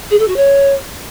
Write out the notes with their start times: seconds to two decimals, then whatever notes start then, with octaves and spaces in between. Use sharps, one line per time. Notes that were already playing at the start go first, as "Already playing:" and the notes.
0.11 G#4
0.19 A4
0.28 F#4
0.36 C#5